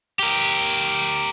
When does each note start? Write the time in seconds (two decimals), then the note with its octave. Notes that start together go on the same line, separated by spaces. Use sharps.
0.19 G4 A#4